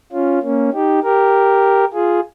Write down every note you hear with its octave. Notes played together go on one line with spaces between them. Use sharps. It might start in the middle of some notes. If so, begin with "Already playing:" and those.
C#4 F4
A#3 C#4
D#4 G4
G4 A#4
F4 G#4